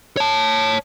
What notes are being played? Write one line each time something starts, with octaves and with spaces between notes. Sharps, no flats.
C#5 A5